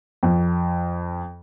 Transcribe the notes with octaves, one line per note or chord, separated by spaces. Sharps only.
F2